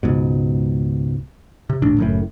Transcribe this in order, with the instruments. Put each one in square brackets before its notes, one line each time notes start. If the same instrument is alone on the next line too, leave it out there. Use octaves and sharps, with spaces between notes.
[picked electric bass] C#2 G#2 B2
C3
D#1 A1 D4
F#1 F#2 A2